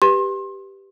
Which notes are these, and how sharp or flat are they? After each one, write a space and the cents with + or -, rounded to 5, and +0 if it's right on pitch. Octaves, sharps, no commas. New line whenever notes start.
G4 +0 B4 +0 C6 +30